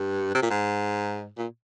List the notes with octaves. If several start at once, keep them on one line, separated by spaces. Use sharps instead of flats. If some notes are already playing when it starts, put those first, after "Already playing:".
Already playing: G2
C3
A#2
G#2
A#2